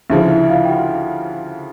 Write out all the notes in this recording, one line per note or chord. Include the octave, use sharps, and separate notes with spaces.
D2 C#3 F3 E4 E5
E4 E5
E5
F4 F5
G5
F#4 F#5